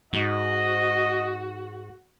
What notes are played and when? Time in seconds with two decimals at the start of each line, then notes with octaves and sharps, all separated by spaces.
0.13 G#2 F#4 D#5